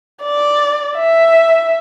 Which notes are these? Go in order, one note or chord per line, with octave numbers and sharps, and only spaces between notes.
D5
E5